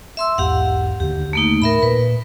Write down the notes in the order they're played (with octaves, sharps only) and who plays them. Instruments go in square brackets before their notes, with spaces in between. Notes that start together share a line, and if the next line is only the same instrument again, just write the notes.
[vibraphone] E5 C6 E6
[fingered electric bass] B1 E2 G#2 [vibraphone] G4 F5 F#5
[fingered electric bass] D#2 D3 [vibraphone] G4
[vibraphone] A3 A#3 D#4
[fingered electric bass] A2 [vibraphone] A#4 E5 B5
[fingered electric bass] A#2 [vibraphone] B4